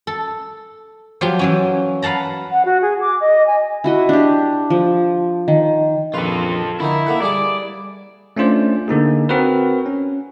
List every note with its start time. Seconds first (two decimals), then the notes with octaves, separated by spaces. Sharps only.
0.07 A4
1.21 F3 F#3 F4 G4
1.39 E3 F#3 C#4
2.02 B4 F5 F#5 A5 A#5
2.51 F#5
2.65 F#4
2.82 G#4
3.01 D6
3.21 D#5
3.47 G#5
3.84 E4 F#4 D#5
4.09 D4 G4
4.70 F3
5.48 D#3
6.14 A#1 F4 A4 B4
6.80 D3 D#3 D#4 E4
7.06 A#3 A4 F#5
7.22 G3 G#4 D5 D6
8.36 A3 C#4 D4 F4 C5 D5
8.88 D3 A#3 D#4 G#4
9.29 C4 F#4 A#4 B4
9.86 C#4